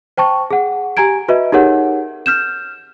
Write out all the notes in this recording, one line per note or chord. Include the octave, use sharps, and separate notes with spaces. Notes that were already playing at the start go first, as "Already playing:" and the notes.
C5 G5 A5 C#6
G#4 F#5
G4 G#5 A#5 G#6 D7
F#4 B4 D#5 E5
D#4 G4 G#4 A#4 C#5 F#5
F6 G6 E7